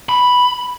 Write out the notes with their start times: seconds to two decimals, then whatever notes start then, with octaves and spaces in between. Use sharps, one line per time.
0.09 B5